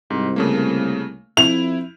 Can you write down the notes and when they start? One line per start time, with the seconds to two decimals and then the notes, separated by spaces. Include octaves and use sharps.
0.10 C2 G#2
0.36 C#3 A3 A#3
1.37 F2 E4 F7